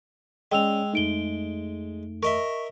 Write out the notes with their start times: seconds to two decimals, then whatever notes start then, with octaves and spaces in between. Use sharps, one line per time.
0.52 G#3 C#4 C#5 D5 G5 E6 F7
0.93 F2 A3 D#4 D7 G7
2.23 A#4 D#5 E5 C#6